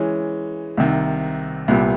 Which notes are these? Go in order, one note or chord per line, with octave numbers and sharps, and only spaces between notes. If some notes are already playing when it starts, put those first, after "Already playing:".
Already playing: E3 G#3 C#4
C2 C3 D#3
C2 A#2 G3 B3